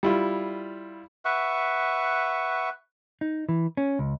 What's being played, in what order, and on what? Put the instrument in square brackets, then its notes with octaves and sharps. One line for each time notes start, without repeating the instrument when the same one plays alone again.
[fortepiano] G3 E4 F4
[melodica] B4 E5 F#5 C#6
[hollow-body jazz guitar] D#4
E3
C#4
C#2